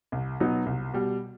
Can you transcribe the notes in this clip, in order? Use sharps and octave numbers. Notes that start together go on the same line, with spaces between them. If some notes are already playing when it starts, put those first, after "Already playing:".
C2
B2 F#3 B3 D#4
C2
B2 G3